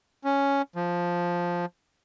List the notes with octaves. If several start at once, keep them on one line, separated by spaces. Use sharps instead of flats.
C#4
F3